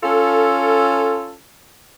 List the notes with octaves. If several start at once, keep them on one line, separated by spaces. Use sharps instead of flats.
C#4 F4 A4